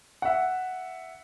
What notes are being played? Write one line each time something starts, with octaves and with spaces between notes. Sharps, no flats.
E5 F#5